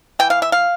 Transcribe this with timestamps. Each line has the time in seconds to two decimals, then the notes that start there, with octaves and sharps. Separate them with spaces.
0.19 E3 G5
0.30 F5
0.42 E5
0.52 F5